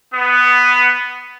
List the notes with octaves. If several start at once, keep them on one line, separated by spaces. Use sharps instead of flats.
B3